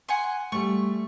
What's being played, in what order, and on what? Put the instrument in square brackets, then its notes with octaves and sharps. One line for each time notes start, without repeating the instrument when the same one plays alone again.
[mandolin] F#5 G#5 C6
[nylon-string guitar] G3 A3 [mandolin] C#6